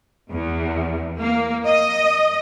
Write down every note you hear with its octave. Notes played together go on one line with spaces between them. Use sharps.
E2
A#3
D#5